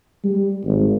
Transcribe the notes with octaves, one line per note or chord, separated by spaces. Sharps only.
G3
G#1